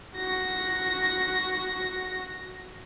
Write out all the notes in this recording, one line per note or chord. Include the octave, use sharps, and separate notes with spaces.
F#4 A#6